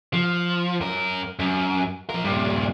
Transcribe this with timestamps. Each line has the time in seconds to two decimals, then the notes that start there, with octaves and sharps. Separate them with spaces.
0.13 F3
0.81 F#2 A#4
1.39 F#2
2.10 F3 A#4
2.24 G2 A#2